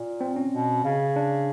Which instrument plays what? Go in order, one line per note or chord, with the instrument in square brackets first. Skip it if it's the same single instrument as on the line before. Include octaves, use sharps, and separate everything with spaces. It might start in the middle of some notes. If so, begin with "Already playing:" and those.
Already playing: [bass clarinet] A#2
[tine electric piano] C4
C#4
[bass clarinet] B2
C#3
[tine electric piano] D4